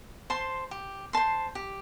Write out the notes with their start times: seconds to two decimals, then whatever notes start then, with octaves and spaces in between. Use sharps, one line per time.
0.30 C5 A5 C6
0.71 G4
1.13 C5 A5 C6
1.55 G4